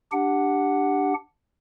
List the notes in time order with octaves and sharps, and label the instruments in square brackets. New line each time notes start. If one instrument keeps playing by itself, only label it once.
[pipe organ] D4 G4 F#5